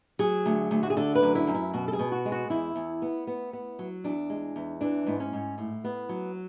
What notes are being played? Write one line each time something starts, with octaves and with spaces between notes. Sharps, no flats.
F#3 G#4
D2
D2
F#4
G#4
D3 A4
B4
F#2
E4
F#2
E4
B2 F#4
A4
G#4
B2
F#4
G#3
F#4
E2 E4
E2
B3
B3
B3
F#3
E2 D4
G#3
E2
E3 D4
G#2 B3
C#4
G#2
A2
B3
F#3